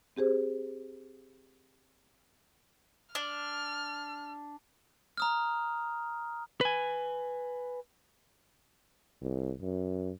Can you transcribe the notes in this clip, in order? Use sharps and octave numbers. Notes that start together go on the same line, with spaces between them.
C4 G4 G#4 C5
D4 F6
A#5 D#6 F6
B4 G#5
C2
F#2